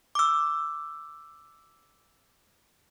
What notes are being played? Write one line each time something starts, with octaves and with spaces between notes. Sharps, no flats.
D6 E6